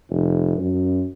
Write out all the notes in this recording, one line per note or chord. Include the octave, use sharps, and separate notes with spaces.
F1
F#2